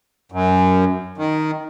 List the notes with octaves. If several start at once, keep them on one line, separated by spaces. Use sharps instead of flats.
F#2
D#3